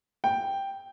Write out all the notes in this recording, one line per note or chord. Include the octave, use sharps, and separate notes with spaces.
G5